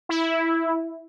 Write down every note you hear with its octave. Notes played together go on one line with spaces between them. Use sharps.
E4